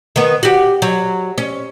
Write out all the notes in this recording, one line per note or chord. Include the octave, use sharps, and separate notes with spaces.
D#3 B3
F#4 G4
F#3
C#4